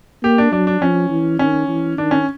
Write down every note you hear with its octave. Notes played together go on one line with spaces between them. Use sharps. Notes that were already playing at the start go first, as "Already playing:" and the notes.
A#3 G4
D4
F#3 D4
D4
F3 C#4
E3
D#3 C#4
E3
D#3 D4
C#4